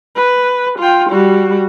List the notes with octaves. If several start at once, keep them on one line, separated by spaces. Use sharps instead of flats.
B4
F4 G5
G3 F#4